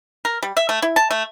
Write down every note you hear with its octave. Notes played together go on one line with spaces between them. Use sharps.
A#4
G3
E5
A3
E4
A5
A3